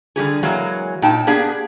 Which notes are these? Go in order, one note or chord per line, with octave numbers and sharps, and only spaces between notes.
D3 G3 G4 G#4
E3 F#3 G#3 A#3
A#2 D#4 G5 A5
A#3 B3 D4 G4 G#4